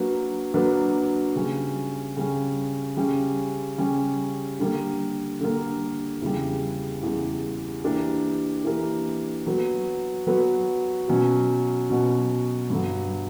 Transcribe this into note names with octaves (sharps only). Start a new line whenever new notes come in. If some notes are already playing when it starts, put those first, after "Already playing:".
Already playing: F#3 A#3 D4 F#4 B4
F#3 A#3 D4 F#4 B4
C#3 G3 C#4
C#3 G3 C#4
C#3 G3 C#4 G4
C#3 G3 C#4 G4
D3 G3 A#3
D3 G3 A#3
E2 C#3 G3
E2 C#3 G3
E3 A#3 D4 G4
E3 A#3 D4 G4
F#3 B3 F#4 B4
F#3 B3 F#4 B4
B2 F#3 C#4 F#4
B2 F#3 C#4 F#4
G2 D3 F#3